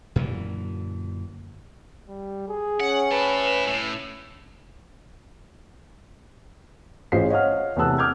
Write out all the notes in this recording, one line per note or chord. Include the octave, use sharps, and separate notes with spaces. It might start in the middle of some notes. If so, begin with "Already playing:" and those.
F#2 A#2 D3 E3
G3
G#4
C#4 F#5
E4 B4 A5
A2
A1 C#4 F4 G#4 C5 C7
C#5 D#5 F5 F#5 F6
E2 C3 A3 A5 E6 F#6
D6 F6 G6 G#6